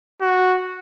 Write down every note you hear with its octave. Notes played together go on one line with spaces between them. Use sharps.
F#4